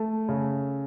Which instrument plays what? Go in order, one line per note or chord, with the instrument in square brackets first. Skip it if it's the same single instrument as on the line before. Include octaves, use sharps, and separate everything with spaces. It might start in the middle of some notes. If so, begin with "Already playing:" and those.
Already playing: [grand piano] A3
C#3